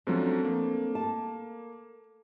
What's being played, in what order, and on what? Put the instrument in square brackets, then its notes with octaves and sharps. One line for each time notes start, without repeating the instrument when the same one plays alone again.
[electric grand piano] F#2 F3 F#3 [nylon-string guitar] A3 C4 D4
[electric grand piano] A#3
[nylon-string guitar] A5